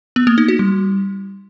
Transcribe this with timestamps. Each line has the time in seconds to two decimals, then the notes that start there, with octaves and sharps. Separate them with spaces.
0.16 B3
0.27 A#3
0.38 D#4
0.48 F#4
0.59 G3